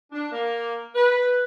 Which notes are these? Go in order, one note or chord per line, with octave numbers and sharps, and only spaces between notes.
D4
A#3
B4